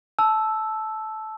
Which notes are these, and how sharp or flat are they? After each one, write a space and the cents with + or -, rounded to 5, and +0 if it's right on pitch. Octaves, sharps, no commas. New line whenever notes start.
A5 -15 E6 +0